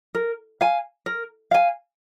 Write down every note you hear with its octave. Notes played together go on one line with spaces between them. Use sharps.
A#4
F5 G#5
A#4
F5 G#5